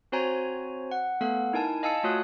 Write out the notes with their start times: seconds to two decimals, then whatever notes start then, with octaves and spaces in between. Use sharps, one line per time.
0.12 C4 F#4 C5 C#5 G#5 A#5
0.91 F#5
1.21 A3 B3 A4 F5 F#5
1.53 D#4 E4 A#4 G#5 A5
1.83 D#5 F5 G#5 A5 E6 C#7
2.03 A3 F4 F#4 C#5 D#6 F#6